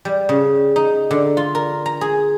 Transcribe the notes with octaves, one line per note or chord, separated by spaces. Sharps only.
G3
C#3
D#4
D3
F4
A#4
A#5
G#4